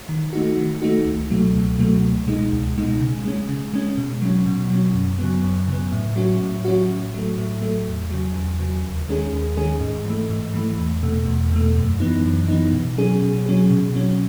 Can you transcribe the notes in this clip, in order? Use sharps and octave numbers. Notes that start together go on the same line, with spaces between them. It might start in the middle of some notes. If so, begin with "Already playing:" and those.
D#3
A3 D#4 F#4
D#3
A3 D#4 F#4
C#2
B2 F#3 A3
C#2
B2 F#3 A3
C#2
B2 G#3 D#4
C#2
B2 G#3 D#4
C#3
G#3 C#4
C#3
G#3 C#4
B2
F#3 C#4
B2
F#3
C#4
F#2
C#3 F#3 B3
F#2
C#3 F#3 B3
A2
F#3 C#4 F#4
A2
F#3 C#4 F#4
A2
F#3 A3
A2
F#3 A3
E2
C#3 F#3
E2
C#3 F#3
D#2
D#3 G#3 C#4 G#4
D#2
D#3 G#3 C#4 G#4
G#2
E3 A3
G#2
E3 A3
E2
B2 A3
E2
B2 A3
F#2
E3 B3 D#4
F#2
E3 B3 D#4
B2
F#3 C#4 G#4
B2
F#3 C#4 G#4
B2
F#3 C#4